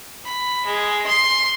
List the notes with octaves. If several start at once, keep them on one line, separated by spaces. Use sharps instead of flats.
B5
G#3
C6